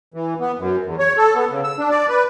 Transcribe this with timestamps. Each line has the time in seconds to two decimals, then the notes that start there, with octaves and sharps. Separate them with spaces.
0.14 E3
0.40 B3
0.58 F#2
0.86 E2
0.99 C#5
1.17 A4
1.35 B3
1.50 C#3
1.64 E6
1.78 D4
1.90 D5
2.09 B4